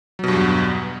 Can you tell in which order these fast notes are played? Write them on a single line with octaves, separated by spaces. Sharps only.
F#3 B2 G2 E2